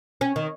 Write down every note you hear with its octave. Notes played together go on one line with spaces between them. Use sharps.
C#4
D#3